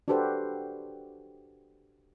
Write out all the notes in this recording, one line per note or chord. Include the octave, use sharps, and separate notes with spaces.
D4 F#4 G4 A4 B4 C5